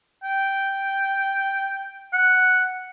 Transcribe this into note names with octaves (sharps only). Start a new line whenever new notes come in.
G5
F#5